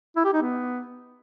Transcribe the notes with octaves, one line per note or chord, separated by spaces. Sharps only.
E4
G4
D#4
B3